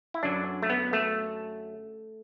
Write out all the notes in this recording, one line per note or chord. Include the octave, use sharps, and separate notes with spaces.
E4
F#2 D3 F#3 D4
A3
B3
A3